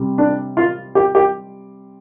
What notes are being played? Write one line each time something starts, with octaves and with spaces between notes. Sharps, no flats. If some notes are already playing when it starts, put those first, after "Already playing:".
Already playing: C3 G3
D4
F4
G4
G4